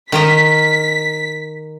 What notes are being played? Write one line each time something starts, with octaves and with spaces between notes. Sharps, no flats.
D#3 A#4 D#5 B6